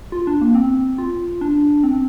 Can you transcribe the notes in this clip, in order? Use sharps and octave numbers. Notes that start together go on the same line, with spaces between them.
F4
D4
A#3
C4
F4
D4
C4